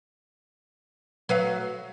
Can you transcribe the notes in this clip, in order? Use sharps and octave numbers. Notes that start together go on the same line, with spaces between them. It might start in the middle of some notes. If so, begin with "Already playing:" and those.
F#3 B4 F5